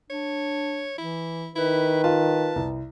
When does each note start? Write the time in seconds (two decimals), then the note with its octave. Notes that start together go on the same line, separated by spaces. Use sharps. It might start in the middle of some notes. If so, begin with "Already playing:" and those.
0.10 D4 C#5
0.98 E3 E4
1.56 D#3 E4 B4
2.04 F4 A5
2.56 C2